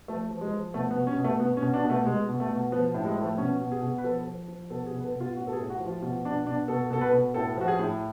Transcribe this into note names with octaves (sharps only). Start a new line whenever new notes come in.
F3 A3
F3
G#3
F3
B2 A3
B3
B2
C#4
B2
A3
B2 B3
C#4
B2
D4
B2
A3
B2 G#3
B2
A3
B2
F3 B3
A2
G#3
F3
A3
B2 C#4
B2
G#4
B2
B4
F3 A4
F3
F3
B2 A4
G#4
B2
B4
A4
B2
F4
A2 F#4
A4
G#4
A2
F#4
F3
F4
B2 F4
B2 D4
B2 D4
B2 A4
B2 A4
B4
B2
A2 A4
F3 F#4
G#4
A2